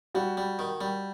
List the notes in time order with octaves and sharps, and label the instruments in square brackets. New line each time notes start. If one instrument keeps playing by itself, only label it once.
[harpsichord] G3 [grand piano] F#4
[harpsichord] G3
D#3
G3